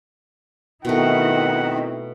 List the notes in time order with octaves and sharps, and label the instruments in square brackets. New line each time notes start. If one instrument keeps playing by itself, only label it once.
[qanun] B2 A3 [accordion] D#3 [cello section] C4 D#4 E4 [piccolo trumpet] F#5